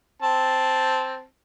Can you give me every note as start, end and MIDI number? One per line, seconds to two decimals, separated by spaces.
0.22 1.23 60
0.22 1.23 81